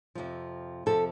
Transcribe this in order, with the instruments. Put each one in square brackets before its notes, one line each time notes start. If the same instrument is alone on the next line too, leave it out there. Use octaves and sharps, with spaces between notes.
[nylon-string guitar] F2 C3 F3
F2 C3 F3 A4